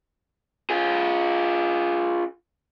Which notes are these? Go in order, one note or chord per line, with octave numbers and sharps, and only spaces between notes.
F4 G#4